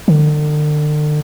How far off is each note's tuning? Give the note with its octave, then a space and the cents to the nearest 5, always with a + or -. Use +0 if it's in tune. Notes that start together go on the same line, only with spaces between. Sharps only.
D3 +40